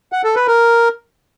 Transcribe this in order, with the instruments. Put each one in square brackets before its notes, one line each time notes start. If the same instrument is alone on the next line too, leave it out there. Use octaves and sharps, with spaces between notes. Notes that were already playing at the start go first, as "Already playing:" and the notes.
[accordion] F#5
A4
B4
A#4